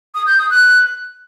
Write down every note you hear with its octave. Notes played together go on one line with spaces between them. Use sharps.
D#6
G6
D#6
F#6